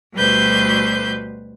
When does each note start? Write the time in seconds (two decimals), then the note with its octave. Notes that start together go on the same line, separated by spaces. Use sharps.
0.15 D2 B2 G3 B4 C5 G6